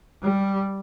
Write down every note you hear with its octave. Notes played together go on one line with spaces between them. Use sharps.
G3